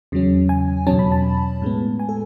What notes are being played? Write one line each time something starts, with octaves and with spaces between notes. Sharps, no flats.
E2 C#3 F#3 C#4
G#5
E2 B2 F#3 C#4 A5
B5
A5
A2 G#3 B3
G#5
A4